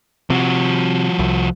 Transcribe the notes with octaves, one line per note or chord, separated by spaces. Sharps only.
C3 F3 F#4
C2